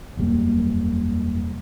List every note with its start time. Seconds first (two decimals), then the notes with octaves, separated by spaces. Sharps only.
0.17 E1 F#2 G3 A#3